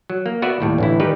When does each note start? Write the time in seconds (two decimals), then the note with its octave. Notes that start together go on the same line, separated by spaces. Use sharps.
0.10 F#3
0.26 A#3
0.42 B3 F#4 B4 D5 E5
0.60 D#2 A2 G3
0.78 A1 D3 E4
1.00 D#3 G3 D#4 G4 B4